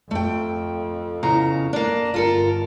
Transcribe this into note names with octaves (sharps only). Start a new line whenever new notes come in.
F2 A3 G5
E2 C#3 A#5
A#3 D4
G1 F4 A4 A#4